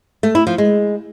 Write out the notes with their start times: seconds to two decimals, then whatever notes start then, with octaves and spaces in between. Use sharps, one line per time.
0.23 A3
0.35 E4
0.47 F3
0.58 G#3